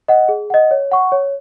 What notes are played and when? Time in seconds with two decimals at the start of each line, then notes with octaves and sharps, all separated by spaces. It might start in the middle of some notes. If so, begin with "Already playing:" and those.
0.08 D#5 F#5
0.29 G#4
0.50 D#5 F#5
0.71 C#5
0.92 F#5 C#6
1.12 C#5